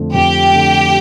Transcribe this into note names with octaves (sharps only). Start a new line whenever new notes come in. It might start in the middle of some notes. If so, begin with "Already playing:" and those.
Already playing: F2 D3 A3
F2 G4
D3 A3